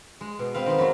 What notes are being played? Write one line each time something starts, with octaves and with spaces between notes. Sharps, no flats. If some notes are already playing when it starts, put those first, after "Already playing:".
G#3
B2
C4 B4 F5
D#3 B3
F#2 F#3